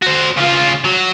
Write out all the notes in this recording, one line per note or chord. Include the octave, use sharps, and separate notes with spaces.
F#4 C5
C#3 F4
F#3